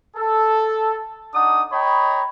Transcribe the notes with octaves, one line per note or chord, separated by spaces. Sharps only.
A4
D4 D#4 F#5 D#6
C#5 D#5 G5 A#5 B5